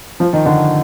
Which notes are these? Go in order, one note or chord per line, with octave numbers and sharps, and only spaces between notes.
F3
D#3
D3